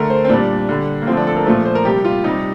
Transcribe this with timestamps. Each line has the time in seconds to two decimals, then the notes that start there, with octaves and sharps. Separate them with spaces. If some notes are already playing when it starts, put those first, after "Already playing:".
Already playing: D3 A3 A#4
0.10 C5
0.25 C4
0.29 A#2 G3 D4
0.69 D3 G3
1.02 A#3
1.07 D3 F3 A3 C4
1.17 D4
1.27 A4
1.36 A#4
1.46 A#2 F3 A3 C5
1.65 C5
1.75 A#4
1.85 C3 G3 G4
2.04 F4
2.24 C3 G3 D#4